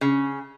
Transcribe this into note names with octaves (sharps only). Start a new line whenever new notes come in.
C#3